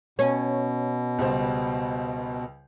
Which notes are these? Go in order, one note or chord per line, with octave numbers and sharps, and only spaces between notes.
B2 C#4
C#2 G3 C5